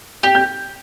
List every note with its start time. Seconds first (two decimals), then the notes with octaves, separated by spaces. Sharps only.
0.23 G4 G5
0.35 G6